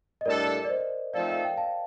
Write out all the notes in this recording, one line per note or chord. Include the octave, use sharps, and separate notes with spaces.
D#5
A2 G3 D4 A4 A#4 D5
D5
C5 D#5
F3 A3 C4 D#4 A4 D5 F5
F5
G5
F5 A5